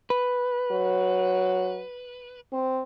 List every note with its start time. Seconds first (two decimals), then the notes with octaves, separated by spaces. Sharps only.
0.10 B4
0.71 F#3
2.53 C4